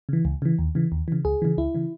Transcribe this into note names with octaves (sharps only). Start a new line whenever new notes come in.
C#3 E3
C#2
C#3 E3
D#2
C#3 E3
D#2
C#3 E3
C#2 G#4
C#3 E3
C#2 E4
C#3 E3